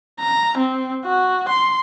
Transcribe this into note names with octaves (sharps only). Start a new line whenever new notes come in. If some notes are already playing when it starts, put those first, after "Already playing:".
A#5
C4
F#4
C6